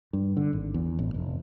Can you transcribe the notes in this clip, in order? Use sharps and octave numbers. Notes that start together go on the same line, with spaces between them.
G2
D3
G#1
E2
A1
F1